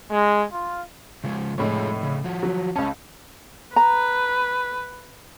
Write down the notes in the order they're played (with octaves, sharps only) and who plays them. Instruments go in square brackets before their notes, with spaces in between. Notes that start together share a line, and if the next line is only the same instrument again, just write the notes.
[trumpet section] G#3
F4
[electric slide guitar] C#3 F3 G#3
[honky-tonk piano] F1 A2 C#5 [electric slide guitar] G#3 F4 G#4
[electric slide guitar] C#3
F3 F#4
[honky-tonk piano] F#3
[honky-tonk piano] C#2 A5 [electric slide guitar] C#4
[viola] B4 [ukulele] A#5